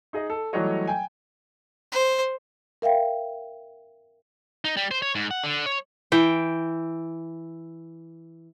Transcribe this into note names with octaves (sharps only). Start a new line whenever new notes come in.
D#4 G#4 D#5
A4
E3 F#3 G3 A3 C#5 D#5
G5 G#5
C5
A#4 E5 F5 G5
D#4
G3
C5
C#5
G#2
F#5
D3
C#5
E3 G5